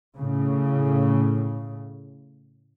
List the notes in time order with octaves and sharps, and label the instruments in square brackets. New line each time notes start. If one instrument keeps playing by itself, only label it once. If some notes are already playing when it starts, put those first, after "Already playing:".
[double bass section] A2 C#3